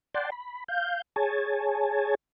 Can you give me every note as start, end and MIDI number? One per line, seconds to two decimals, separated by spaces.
0.14 0.30 74
0.14 0.30 78
0.14 0.30 79
0.14 0.30 81
0.14 0.30 84
0.32 0.64 83
0.68 1.02 77
0.68 1.02 91
1.16 2.15 68
1.16 2.15 73
1.16 2.15 80
1.16 2.15 81